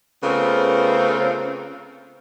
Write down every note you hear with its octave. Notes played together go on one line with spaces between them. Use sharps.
C#3 A3 B3 C4 F4 A#4